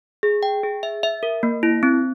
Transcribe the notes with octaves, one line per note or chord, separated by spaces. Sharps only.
G#4
G5
G#4
E5
E5
A#4
A#3
E4
C4